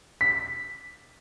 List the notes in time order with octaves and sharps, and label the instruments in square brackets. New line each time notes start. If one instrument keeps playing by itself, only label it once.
[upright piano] B6